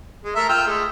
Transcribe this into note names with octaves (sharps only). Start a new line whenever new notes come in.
G#3
A3 A#4 E5
F4 G5 E6
G#3 A3